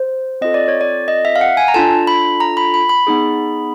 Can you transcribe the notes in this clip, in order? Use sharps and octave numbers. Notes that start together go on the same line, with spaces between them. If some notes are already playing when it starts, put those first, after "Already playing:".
Already playing: C5
C4 F4 A4 D#5
D5
C#5
D5
D#5
E5
F5
F#5
G#5
A#5
D4 F4 A4 A5
B5
A#5
B5
B5
B5
B3 D#4 G#4